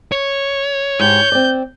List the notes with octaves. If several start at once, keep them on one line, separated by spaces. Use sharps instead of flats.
C#5
G#2 G4 G6
C4 D5